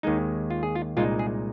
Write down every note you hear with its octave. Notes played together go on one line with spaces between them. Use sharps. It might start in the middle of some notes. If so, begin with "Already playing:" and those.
D#2 D#3 G#3 D#4
F4
G#4
F4
C2 A#2 G#3 D#4 F4
G#4